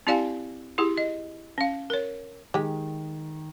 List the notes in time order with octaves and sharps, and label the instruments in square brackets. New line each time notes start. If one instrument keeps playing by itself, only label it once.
[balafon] C4 E4 G4 D5 F5 G#5
E4 G4 G#4
D#5
C#4 F5
A#4 C#5
[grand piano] D#3 [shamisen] G#3 G4